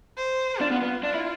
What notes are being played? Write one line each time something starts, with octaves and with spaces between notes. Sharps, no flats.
C5
D4 F4
B3
B3
D4 F4
E4